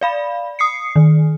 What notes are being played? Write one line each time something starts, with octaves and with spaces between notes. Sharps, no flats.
D5 F5 B5
D#6 C7 C#7
D#3